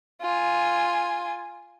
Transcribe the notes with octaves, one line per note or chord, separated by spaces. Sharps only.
F4 G#5